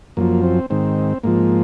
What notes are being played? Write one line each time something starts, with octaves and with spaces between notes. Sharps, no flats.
F#2 F3 A#3
C4
G#2 D#3 C4
G#2 F3 A#3